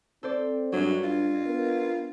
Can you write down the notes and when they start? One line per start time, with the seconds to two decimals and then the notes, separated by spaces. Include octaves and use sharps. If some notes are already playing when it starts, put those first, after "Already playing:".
0.23 C4 A4 C5 D5
0.73 G2 F#3 D4
1.03 F4
1.46 B3 A#4